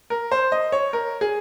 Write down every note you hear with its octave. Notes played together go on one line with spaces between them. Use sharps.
A#4
C5
D#5
C#5
A#4
G#4